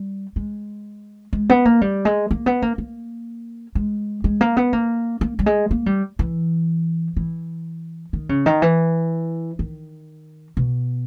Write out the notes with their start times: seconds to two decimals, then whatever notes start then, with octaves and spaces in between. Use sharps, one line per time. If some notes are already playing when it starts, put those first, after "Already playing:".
Already playing: G3
0.36 G#3
1.33 G#3
1.49 B3
1.65 A#3
1.81 G3
2.05 G#3
2.31 A#3
2.46 B3
2.62 A#3
2.78 A#3
3.75 G#3
4.24 G#3
4.41 A#3
4.57 B3
4.73 A#3
5.21 A#3
5.39 G3
5.46 G#3
5.71 A#3
5.86 G3
6.19 E3
7.16 E3
8.13 D#3
8.29 C#3
8.46 D#3
8.62 E3
9.59 D#3
10.57 B2